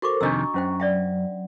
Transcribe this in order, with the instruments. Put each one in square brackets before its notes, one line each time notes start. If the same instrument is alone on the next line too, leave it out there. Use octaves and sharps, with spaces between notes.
[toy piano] F#4 C#6 D6 [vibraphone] A4 A#4 C5
[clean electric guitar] F2 C3 D#3 [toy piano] D4 D#5 E6 [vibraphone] A#5 C#6
[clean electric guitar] F#2 [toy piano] C#4 C5 G5
[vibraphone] F#3 [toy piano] D5 E5 G5